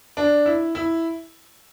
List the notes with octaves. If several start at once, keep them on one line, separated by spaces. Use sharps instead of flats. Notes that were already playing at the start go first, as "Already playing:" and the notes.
D4
E4
E4